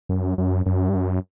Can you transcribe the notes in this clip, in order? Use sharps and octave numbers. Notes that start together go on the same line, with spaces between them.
F#2
F#2
F#2
G2
F#2